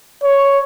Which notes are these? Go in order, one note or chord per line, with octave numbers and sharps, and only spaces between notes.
C#5